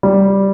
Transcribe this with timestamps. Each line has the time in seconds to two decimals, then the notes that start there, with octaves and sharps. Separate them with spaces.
0.03 G3